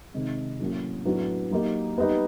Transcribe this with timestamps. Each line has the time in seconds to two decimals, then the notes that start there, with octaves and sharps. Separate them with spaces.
0.14 C3 D#3 G#3
0.59 A2 F#3 A#3 C#4 F#4
1.05 A2 F#3 B3 D4 F#4
1.51 F#3 A#3 D#4 G4
1.98 G3 B3 D#4 G4